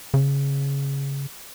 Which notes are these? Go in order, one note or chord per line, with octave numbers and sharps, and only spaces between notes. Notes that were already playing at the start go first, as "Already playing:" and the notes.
C#3